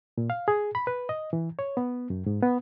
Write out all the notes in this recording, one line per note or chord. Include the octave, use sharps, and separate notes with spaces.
A#2
F5
G#4
B5
B4
D#5
E3
C#5
B3
F#2
G#2
B3